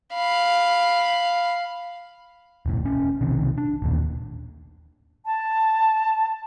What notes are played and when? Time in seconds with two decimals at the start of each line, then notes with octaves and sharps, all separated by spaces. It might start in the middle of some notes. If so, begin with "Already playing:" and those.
0.14 F5 B5
2.66 E1 A2
2.83 E1 C#4
3.21 B1 C3 D#3
3.58 D4
3.82 A1 D#2 A#2
5.26 A5